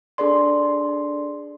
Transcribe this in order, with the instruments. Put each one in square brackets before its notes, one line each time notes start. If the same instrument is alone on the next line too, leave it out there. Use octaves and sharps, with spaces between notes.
[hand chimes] D4 G#4 A4 D5 C6